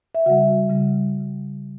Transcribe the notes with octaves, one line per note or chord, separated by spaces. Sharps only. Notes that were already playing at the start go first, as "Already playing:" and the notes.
E5
C#3 G3 F#4 F#5
C#3 G3